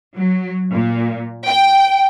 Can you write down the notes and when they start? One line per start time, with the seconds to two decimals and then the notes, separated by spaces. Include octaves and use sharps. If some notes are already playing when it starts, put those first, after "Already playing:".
0.16 F#3
0.73 A#2
1.46 G5